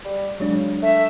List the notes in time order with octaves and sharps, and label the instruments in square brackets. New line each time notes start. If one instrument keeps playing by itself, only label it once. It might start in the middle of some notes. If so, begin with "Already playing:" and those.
[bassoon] G3
[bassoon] C#3 [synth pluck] F#3 G#3 D4
[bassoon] A3 [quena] E5